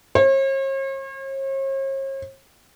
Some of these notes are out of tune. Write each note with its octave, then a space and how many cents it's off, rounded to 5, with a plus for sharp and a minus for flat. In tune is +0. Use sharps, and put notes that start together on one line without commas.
C#5 -45